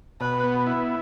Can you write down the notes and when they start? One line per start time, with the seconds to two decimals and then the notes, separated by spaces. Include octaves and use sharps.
0.21 B2 B4
0.44 B3
0.67 E4